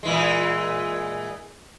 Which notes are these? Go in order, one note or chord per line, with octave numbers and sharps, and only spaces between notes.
A#2 E3 G#3